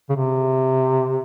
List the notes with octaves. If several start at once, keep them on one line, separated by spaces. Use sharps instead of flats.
C#3
C3